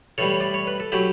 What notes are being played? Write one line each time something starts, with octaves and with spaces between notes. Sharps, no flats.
A2 E3 G3 A4 C#5
D5
C#5
B4
A4
F#3 A3 E4 G4